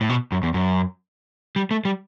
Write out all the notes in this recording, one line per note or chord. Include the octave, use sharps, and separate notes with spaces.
A2
B2
F#2
E2
F#2
G3
A3
G3